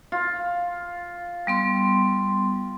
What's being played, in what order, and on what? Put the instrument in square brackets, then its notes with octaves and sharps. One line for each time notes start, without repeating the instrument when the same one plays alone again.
[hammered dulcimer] F4
[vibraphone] G3 B3 C6